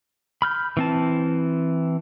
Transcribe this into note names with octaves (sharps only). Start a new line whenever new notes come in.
B5 F6 G6
E3 C4 A5